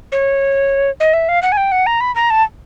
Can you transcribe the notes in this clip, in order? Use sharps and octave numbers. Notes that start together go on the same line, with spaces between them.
C#5
D#5
E5
F5
F#5
G#5
G5
F#5
A#5
B5
A#5
A5